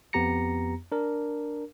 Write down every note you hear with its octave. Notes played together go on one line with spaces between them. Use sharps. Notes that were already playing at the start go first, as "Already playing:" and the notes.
F2 B3 G4 A#5 A#6 C#7
D4 A#4